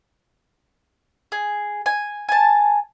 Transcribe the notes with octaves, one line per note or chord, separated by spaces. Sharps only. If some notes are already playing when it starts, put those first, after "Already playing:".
G#4
G#5
G#5 A5